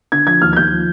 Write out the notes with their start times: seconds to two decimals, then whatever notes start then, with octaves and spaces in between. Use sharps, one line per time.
0.12 D3 G#6
0.27 F3 G#6
0.42 D#2 F6
0.53 G#6
0.56 D#2 G6
0.71 F3